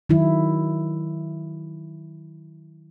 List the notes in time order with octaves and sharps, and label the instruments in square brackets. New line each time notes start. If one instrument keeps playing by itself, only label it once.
[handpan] D#3 F#3 E4